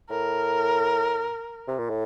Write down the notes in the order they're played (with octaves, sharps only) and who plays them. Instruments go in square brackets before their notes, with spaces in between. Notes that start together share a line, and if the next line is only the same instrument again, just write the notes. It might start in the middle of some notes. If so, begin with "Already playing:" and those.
[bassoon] A2 [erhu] A#4
[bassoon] C3
A#2
A2